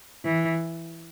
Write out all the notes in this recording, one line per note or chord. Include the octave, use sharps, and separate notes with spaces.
E3